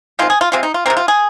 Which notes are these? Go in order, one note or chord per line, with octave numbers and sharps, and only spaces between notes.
D#3 G#3 C4 F4
G#4
F4
C3 G#3 C4 F4
D#4
F4
C3 G#3 C4 A#4
F4
G#4